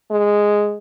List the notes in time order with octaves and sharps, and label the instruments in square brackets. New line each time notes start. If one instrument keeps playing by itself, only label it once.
[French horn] G#3